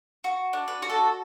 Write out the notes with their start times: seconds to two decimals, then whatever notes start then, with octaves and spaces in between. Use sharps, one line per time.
0.24 F#4
0.53 D4
0.68 B4
0.82 F#4
0.90 A4